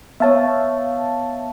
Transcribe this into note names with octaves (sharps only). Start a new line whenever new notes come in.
B3 C#5 E5 F5 A5